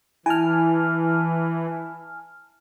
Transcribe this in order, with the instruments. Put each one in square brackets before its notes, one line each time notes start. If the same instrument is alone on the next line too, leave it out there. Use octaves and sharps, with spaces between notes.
[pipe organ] E3 [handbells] E4 [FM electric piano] G#5 A5 F6